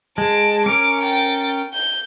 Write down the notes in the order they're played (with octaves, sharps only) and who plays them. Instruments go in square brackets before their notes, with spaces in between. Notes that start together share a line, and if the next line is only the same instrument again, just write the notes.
[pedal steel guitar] G#3 [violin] A5 D7
[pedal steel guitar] C#4 A#4 [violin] D6
[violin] G5 A6
G6